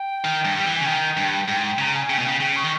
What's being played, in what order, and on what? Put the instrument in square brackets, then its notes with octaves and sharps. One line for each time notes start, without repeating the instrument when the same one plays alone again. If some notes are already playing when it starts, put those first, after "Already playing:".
Already playing: [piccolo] G5
[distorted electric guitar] D#3
G2
G3
E3
[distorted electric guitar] C#3 [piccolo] G#5
[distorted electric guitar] D#3 [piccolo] G5
[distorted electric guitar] G2
G#2
[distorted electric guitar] C#3 [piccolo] A#5
[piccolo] G#5
[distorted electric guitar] C#3 [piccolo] G5
[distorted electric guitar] B2 [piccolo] G#5
[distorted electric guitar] C#3 [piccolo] G5
[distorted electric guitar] C#3 [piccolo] G5
[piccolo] C#6
[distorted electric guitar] D#3